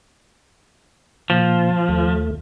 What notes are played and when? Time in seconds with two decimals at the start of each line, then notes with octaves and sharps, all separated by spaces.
1.30 A#2 F3
1.89 D#2 A3